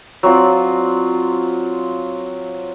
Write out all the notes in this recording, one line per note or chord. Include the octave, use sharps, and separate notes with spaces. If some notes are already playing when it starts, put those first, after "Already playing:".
F#3 C4 F4 D5